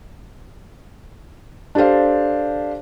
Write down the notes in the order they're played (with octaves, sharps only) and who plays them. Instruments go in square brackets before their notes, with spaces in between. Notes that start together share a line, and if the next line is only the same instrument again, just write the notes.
[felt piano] D4 G4 A4 C5 F5